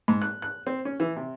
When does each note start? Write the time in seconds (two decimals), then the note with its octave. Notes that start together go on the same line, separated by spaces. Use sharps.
0.08 G#2
0.22 F#6
0.42 F#6
0.67 C4
0.85 C#4
1.00 E3
1.16 C3